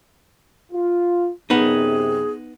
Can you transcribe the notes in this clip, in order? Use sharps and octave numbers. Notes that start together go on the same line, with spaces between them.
F4
F#2 C3 B3 D#4 G#4